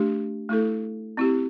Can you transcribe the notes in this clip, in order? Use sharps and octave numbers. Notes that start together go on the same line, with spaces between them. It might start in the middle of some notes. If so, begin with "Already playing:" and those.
Already playing: A3 D4 G4
A3 E4 A4
C4 E4 G4